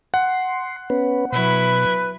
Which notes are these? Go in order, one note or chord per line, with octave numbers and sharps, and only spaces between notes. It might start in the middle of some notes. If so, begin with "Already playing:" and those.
F#5 C6
B3 C#4 B4
B2 F#3 E4 B4 G#6